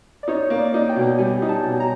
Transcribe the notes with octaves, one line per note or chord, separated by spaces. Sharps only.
D5
D#4 C#5
A#3
D5
D#4
G5
B2
G3 G#5
D#4
A5
B2
A#5